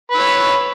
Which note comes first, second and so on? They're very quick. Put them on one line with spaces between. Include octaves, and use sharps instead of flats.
B4 E6 C#5